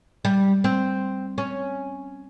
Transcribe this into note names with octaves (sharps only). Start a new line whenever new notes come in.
G3
C4
C#4